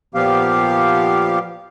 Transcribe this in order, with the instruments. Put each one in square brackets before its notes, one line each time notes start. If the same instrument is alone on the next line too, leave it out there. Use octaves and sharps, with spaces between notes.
[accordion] A#2 F3 B3 G4 F5